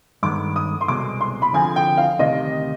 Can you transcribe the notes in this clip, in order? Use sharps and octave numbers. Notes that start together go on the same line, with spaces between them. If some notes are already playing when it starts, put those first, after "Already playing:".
G2 D#3 G#3 B3 D6
D#6
C6
C2 B2 G#3 D6
C6
B5
D3 F3 C4 F4 G#4 G#5
G5
F5
D2 C3 D#3 D#5